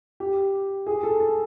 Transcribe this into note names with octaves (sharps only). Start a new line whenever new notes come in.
G4
G#4
A4
A4